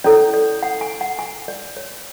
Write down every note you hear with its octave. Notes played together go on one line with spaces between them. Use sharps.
C#4 E4 A4 C#5 D5
D5
F#5
G#5
F#5
G#5
D5
C#5